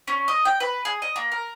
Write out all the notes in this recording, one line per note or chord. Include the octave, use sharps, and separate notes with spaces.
C#4
D#5
G5
B4
G#4
D#5
A#3
A#4